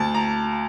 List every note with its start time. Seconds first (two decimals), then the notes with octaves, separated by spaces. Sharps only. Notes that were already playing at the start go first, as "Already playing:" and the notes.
Already playing: D2 A5
0.14 A#5